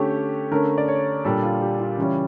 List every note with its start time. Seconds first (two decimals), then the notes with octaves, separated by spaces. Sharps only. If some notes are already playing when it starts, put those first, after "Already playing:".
Already playing: D3 A3 C#4 G4
0.51 D3 A3 C#4 A#4
0.78 D5
0.88 C#5
1.25 A#2 G3 D4 A4
1.43 F4
1.61 G4
1.79 F4
1.98 C#3 E3 G3 C#4